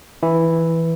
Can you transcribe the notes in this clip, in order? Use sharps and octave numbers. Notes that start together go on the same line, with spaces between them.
E3 E4